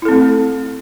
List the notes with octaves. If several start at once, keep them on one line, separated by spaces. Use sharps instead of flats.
A3 C4 E4 A4